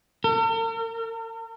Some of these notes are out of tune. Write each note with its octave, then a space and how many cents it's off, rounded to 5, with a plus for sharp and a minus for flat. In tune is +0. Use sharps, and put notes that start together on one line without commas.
A#4 -45